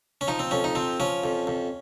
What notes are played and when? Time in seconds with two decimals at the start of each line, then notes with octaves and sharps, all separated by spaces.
0.21 C#4
0.28 F3 D#4
0.39 C4
0.51 F2 C#4
0.64 D#4
0.75 F3 C4
1.00 F3 C#4
1.24 F2
1.47 F2